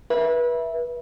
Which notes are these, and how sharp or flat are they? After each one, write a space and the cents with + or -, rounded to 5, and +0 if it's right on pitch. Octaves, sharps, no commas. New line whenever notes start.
B4 -30 E5 +0